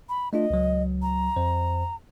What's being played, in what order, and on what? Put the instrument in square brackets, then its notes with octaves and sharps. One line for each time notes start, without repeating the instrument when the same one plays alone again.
[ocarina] B5
[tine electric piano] A3 D4 F4 [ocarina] D#5
[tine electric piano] C#2 F#3
[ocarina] A#5
[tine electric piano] F2 C5